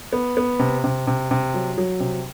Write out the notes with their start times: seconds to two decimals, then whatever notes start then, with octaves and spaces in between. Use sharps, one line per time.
0.13 B3
0.37 B3
0.59 C3
0.84 C3
1.07 C3
1.31 C3
1.54 F#3
1.78 F#3
2.00 C3